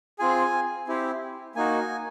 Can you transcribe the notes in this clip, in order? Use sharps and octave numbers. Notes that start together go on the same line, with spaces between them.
C4 F4 G#4 G#5
C4 E4 G4
A#3 D#4 F#4 G#5